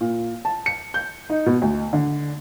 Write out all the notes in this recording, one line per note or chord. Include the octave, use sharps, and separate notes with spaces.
A#2
A5
C#7
G6
D#4
B2
D2
D3